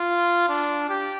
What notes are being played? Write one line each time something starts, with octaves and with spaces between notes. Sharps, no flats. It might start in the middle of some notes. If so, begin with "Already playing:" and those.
Already playing: F4
D4
G4